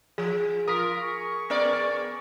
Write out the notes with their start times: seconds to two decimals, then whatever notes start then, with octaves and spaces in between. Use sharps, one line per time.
0.18 F3 G#4
0.68 F4 A#4 D#6 B6
1.00 G#4 C#6
1.50 B3 A#4 D5